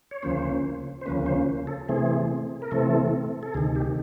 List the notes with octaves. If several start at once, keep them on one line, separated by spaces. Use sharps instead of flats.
C#5
D2 C#3 F3 A#3 C#4 C5
C5
D2 C#3 F3 A#3 C#4 B4
C5
A4
C3 E3 A3 C4 G#4
A#4
C3 E3 A3 C4 A4
A4
D2 C3 D#3 G#4
G4